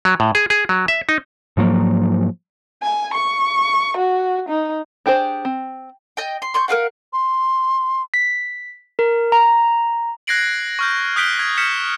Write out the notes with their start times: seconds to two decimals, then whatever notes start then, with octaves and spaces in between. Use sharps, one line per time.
0.05 F#3
0.20 A2
0.35 G#4
0.50 G#4
0.69 F#3
0.88 E5
1.09 D#4
1.57 G#2 F3 F#3 A#3
2.83 G#5
3.14 C#6
3.97 F#4
4.49 D#4
5.06 D4 G4 G#4 C5
5.45 C4
6.17 D#5 G5
6.42 C6
6.54 C6 C#6 G6
6.68 A#4 B4 F5 F#5
7.13 C6
8.14 B6
8.99 A#4
9.32 A#5
10.27 F#6 G#6 A#6 C7 D7 F#7
10.79 C#6 F6 G6
11.16 D#6 F#6 G6 B6 D7 G7
11.39 F6 G#6
11.58 F6 G6 B6 C#7 E7